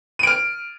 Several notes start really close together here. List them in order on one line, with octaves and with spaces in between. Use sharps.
D#7 D7 F6